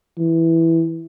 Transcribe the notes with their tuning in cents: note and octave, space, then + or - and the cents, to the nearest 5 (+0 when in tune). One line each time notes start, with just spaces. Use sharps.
E3 +0